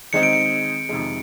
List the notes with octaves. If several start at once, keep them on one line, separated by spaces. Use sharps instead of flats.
D#3 G#3 C4 D#4 C#7
D7
C#7
F2 C3 D#3 G#3